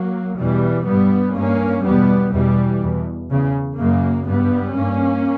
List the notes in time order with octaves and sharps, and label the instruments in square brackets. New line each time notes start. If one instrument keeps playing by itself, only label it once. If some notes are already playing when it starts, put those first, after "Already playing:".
Already playing: [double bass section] F#3 A#3
E2 B2 E3 G3
G2 G3 B3
G2 A#3 C#4
E2 B2 G3 B3
E2 B2 E3 G3
E2 B2
E2 C#3
F#2 C#3 F#3 A#3
G2 G3 B3
G2 A#3 C#4